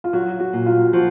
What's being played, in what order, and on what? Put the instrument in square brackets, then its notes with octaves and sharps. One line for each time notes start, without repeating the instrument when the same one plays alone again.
[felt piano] F4
[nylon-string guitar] F#3 [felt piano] F#4
[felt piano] F#4
[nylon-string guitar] A#2
[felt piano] F4
[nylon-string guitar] F3 [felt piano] F#4